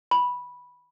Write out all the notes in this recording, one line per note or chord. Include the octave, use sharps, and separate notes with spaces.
B5